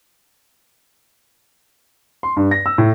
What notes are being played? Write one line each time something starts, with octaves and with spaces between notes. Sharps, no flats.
C6
G2
A#6
E6
A2